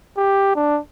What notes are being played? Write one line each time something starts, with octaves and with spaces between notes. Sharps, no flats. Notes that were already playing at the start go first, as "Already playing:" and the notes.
G4
D4